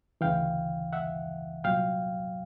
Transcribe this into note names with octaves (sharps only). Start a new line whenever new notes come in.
D2 C#3 E3 F5 G5
E5 F#5
C2 A#2 F#3 F5 G5